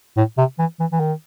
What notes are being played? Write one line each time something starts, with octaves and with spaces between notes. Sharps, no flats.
A2
C3
E3
E3
E3
D#3